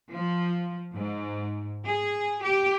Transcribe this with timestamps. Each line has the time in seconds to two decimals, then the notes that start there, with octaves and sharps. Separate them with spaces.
0.13 F3
0.95 G#2
1.86 G#4
2.42 G4